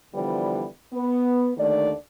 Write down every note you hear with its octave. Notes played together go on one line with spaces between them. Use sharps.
D3 E3 F3 G3 B3
B3
D#2 D3 D#3 A3 D5